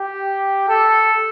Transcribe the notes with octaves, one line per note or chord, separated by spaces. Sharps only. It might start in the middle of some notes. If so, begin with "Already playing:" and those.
Already playing: G4
A4